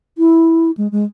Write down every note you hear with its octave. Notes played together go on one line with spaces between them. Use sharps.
E4
G#3
G#3